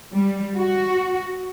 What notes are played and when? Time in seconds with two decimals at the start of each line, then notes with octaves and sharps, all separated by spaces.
0.12 G3
0.56 F#4